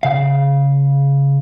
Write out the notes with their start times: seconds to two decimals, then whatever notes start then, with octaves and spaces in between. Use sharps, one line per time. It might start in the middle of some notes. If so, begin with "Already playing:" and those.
0.03 C#3 F5